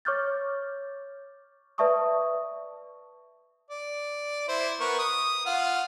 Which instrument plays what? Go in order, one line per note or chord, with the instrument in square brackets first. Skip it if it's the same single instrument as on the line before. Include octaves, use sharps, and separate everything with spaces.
[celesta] C#5 C#6 D6 F6 G6 A6
B4 D5 E5 A5 C#6 D#6
[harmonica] D5
E4 C5
B3 A#4 C#6
D#6
F4 F5 F#5